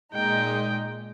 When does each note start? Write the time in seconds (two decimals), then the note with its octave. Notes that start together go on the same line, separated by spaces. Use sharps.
0.14 A#2 G#3 D#4 G5